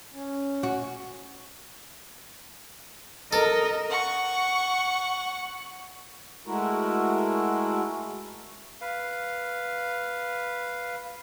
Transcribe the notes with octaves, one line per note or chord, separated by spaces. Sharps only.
C#4
F#4
A4 A#4 D#5
F#5 C#6
G#3 A3 E4 F#4 A#4
B4 F5